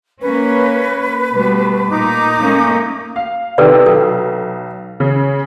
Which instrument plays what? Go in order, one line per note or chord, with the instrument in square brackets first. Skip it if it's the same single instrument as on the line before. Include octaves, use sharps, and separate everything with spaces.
[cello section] A#3 C#4 [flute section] B4
[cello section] B2 G3 A3
[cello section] A#2 [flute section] D#4 D6
[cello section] A3 A#3 C#4
[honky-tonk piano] F5
[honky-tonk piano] C3 D#3 [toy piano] A4 B4 D5
[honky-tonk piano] B1 [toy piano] A4
[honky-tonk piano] C#3